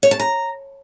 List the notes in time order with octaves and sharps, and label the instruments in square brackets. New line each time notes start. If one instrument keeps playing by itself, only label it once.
[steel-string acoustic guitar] C#5
A5
A#5